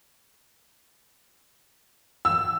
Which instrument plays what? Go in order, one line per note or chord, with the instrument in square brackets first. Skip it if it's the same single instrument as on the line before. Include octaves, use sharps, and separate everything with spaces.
[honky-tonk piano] E6